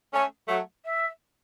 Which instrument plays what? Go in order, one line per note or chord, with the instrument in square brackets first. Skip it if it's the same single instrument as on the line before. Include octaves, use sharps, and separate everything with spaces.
[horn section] A3 C#4 [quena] G#5
[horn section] F#3 A3 [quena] F#5
[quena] E5